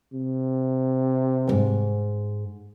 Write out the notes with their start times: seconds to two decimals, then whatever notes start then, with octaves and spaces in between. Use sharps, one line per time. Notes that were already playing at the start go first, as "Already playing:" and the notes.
0.13 C3
1.48 E2 G#2